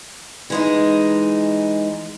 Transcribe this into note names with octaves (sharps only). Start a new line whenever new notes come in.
E3 G#3 D#4